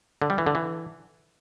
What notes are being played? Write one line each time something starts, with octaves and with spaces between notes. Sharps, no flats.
D3
G3
E3
D3
E3